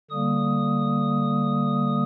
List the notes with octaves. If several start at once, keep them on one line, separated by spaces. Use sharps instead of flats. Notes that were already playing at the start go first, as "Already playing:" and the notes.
D3 G3 A#3 D#6